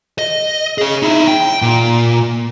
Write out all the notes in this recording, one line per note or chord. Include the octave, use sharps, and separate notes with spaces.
D#5
G#4 C#5
D#4 E4
G5
A#2